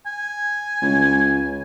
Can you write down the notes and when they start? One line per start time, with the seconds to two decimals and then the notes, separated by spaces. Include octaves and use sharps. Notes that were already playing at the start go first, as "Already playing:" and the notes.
0.06 G#5
0.82 C#2